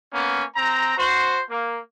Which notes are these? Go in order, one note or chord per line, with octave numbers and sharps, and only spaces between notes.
A#3 B3 C#4
C4 A#5
F#4 C5
A#3